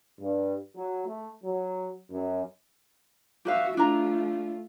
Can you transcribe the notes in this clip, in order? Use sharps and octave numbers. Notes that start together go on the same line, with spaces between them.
G2
F#3
A3
F#3
F#2
F#4 G4 B4 E5 F5
A3 D4 E4 F4 A#5